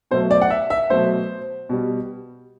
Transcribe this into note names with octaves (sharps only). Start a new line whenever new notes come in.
B2 F#3 A3 C5
D5
F#5
E5
E5
B2 F#3 A3 C5
B2 G3